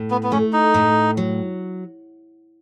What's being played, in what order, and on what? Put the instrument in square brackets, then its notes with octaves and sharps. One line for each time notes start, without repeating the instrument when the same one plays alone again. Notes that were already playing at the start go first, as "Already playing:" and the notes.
Already playing: [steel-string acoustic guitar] A2
[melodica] B3
B3
[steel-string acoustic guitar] A3 [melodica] C#4
[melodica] D#4
[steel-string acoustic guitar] A2
F#3